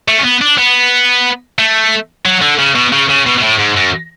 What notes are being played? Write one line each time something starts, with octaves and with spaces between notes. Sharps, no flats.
A3
C#4
B3
D4
B3
A3
F#3
D3
C#3
B2
C#3
C#3
B2
B2
A2
G#2
F#2